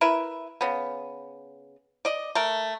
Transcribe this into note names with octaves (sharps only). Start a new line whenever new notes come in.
E4 A#4 B4 E5
C#3 B3
D5 D#5
A3 A#4